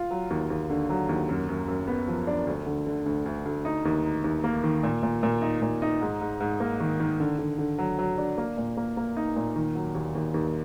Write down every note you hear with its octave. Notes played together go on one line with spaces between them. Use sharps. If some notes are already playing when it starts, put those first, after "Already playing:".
Already playing: F4
F#3
D#2
D#2
D3
F#3
D#2
F#2
F#2
F#2
B3
F3
D4
D2
D3
D3
D2
D2
D2
D#4
D#2
D#4
D#2
A#3
D#3
A#2
A#2
A#2
D#4
A#2
D#4
G#2
G#2
G#2
A#3
D#3
D#3
D3
D3
D3
F#3
F#3
D4
A#3
A#2
A#3
A#3
D#4
A#2
D#3
F#3
D#2
D#2
D#2